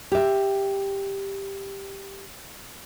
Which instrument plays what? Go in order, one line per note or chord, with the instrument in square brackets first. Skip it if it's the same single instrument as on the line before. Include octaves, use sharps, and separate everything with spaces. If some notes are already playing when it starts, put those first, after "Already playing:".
[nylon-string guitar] G4 E5